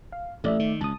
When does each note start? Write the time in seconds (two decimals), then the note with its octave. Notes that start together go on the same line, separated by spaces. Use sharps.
0.12 F5
0.44 A1 A3 D5 E5
0.59 D#3
0.81 C#2 A5 D#6